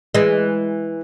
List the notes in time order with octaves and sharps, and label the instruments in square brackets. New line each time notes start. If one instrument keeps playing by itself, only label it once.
[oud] E3 G#3